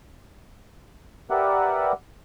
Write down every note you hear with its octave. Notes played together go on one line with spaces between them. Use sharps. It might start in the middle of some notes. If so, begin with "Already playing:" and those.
G4 A#4 B4 D5 E5 F#5